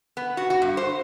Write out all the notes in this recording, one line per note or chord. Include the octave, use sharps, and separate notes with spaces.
B3
F#4
F#4
G2
C5